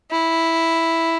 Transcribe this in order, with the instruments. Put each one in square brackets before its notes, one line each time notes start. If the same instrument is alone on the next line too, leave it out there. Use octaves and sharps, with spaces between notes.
[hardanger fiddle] E4